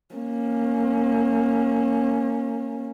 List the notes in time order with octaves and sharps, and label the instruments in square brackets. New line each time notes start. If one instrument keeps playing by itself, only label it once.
[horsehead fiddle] A#3 C#4